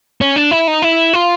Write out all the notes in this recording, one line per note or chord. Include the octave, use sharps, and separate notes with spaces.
C#4
D4
E4
D#4
E4
F4